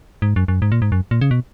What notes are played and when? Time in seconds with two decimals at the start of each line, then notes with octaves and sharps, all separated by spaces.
0.22 G#2
0.36 F#2
0.48 F#2
0.62 G#2
0.72 A#2
0.82 G#2
0.92 F#2
1.11 A#2
1.21 C#3
1.31 B2